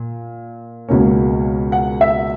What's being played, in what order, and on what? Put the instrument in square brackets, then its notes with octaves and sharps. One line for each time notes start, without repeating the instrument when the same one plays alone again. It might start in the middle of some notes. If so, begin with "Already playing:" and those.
Already playing: [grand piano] A#2
C#2 B2 A#3 C#4
F#5
E5